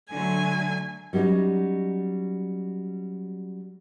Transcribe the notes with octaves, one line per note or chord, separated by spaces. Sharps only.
D3 F#3 A3 G#5
F#3 G3 C#4 D#4